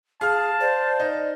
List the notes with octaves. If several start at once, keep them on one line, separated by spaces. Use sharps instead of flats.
G#4 F5 A5 F6
C5 D5
D#4